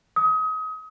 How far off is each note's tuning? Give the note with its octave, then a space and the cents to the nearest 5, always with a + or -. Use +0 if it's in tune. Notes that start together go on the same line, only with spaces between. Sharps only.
D#6 +30